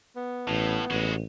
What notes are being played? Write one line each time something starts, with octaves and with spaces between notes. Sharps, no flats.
B3
A1 A2
A1 G#3 F#4